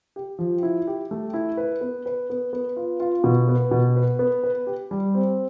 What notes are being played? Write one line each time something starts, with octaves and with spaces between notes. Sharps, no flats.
G4
F3
E4
G4
A3
E4
B4
B3
B4
B3
B3
F4
F4
B2
B3
B2
B4
B3
B4
G4
G3
C4